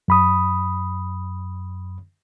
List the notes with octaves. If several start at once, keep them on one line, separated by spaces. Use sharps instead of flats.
F#2 B5 D#6